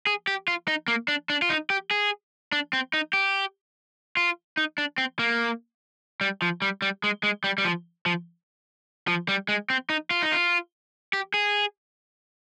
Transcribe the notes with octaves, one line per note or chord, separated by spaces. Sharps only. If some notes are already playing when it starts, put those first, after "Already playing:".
G#4
G4
F4
D#4
A#3
D4
D4
F4
D#4
G4
G#4
D4
C4
D#4
G4
F4
D#4
D4
C4
A#3
G3
F3
G3
G3
G#3
G#3
G3
G3
F3
F3
F3
G3
G#3
C4
D#4
F4
D#4
F4
G4
G#4